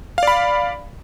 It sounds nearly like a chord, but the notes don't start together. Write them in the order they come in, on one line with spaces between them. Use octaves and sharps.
F5 D5 B5